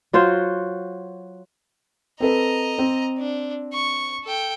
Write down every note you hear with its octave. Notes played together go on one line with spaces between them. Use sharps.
F#3 F4 F#4 C5
C4 A4 B4 D#5 A#5
C4
D4
C#6
A4 G5